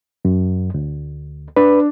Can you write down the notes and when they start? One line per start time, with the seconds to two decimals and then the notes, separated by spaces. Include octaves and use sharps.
0.25 F#2
0.74 D2
1.56 D4 B4